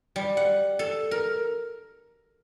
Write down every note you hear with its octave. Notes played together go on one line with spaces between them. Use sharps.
G3
F#5
A4
A#4